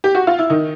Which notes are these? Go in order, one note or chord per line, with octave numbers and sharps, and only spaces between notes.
G4
F#4
F4
E4
D#3 D#4